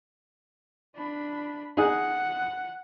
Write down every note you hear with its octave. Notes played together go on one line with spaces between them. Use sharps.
D4 B5
D#4 G#4 F#5